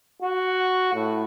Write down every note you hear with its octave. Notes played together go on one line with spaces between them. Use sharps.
F#4
A2